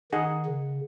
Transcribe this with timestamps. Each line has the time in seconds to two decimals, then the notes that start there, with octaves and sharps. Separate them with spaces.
0.12 D#3 D#4 G#4 D#5 F#5
0.46 C#3